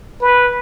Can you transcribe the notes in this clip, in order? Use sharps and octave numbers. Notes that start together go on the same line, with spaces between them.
B4